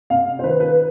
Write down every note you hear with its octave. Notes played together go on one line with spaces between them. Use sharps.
C3 F5
C5
D#3 B4
B4